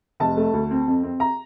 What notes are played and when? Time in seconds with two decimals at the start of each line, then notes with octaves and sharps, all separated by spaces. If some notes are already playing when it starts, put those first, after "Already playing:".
0.20 F1 A5
0.37 A3
0.54 D2
0.71 C4
0.88 F2
1.03 C4
1.20 A#5